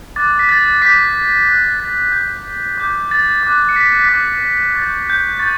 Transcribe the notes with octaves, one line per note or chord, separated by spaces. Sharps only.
D6 F#6 A6
B6
A6
D6 G6 B6
D6 F#6
A6
D6 F#6 G6
D6 G6
A6
D6 F#6
C#7
B6
B6
D6 G6 A6
C#6 G6 A6
G6
G6
C#6 G6 A6